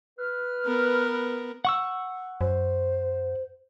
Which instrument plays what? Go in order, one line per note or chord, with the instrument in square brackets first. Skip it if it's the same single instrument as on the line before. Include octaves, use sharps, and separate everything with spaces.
[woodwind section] B4 F6
[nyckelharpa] B3 A#4
[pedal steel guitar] F#5 C#6 E6
[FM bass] F#2 [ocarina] C5